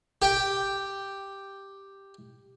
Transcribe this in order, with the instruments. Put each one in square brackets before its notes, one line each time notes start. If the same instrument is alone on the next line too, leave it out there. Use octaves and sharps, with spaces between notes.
[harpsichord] G4 G5